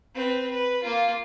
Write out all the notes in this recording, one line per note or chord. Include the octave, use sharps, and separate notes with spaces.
C4 B4
B4
A#3 F4